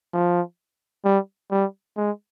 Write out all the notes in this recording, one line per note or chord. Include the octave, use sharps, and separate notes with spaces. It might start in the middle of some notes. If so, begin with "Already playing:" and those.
F3
G3
G3
G#3